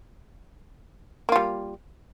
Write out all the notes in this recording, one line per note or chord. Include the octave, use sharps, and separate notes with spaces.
G3 A#3 F4